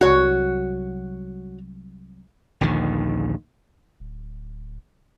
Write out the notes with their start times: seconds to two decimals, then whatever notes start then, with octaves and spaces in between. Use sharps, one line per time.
0.01 C2 F#3 F#4 C#5
2.61 A#1 D#2 D3 D#3
4.00 D1